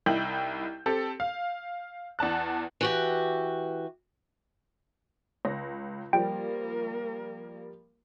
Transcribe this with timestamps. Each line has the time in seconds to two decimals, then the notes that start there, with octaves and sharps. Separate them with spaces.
0.06 C2 D#4 E4 G5 G6 F#7
0.86 C4 G4 A4
1.20 F5
2.19 E2 D5 A5 F#6
2.81 E3 F#4 G4
5.45 C#2 A#6
6.13 F3 G3 A#3 A#4 G5